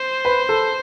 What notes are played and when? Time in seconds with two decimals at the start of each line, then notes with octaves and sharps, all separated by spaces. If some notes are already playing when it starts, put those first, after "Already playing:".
Already playing: C5
0.25 B4
0.49 A4